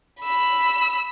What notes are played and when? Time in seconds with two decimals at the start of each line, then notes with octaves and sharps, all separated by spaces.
0.21 B5 E6